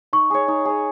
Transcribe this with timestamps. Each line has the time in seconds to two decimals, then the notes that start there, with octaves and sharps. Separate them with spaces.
0.13 D#4 C#6
0.30 G#4 C#5
0.48 D#4
0.65 G#4 C#5